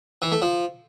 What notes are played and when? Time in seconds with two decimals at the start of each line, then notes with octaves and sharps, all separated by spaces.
0.22 E3
0.32 A3
0.42 F3